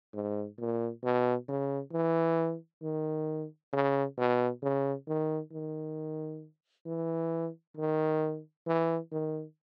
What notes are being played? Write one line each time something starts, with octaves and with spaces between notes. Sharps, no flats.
G#2
A#2
B2
C#3
E3
D#3
C#3
B2
C#3
D#3
D#3
E3
D#3
E3
D#3